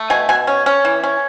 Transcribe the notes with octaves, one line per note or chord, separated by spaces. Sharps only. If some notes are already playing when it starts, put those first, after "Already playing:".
Already playing: A3
B2 G#5
B2 G#5
C#4
C#4
E3
C#4